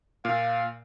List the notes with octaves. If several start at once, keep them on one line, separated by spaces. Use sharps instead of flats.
A#2 F5